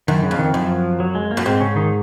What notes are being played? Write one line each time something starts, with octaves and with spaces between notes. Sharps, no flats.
F#2 D#3
C#3
F2
D#3
F#2 F3
F#3
G#3
A#3
F#2
G#2 C4
C#3 C#4
D#3 D#4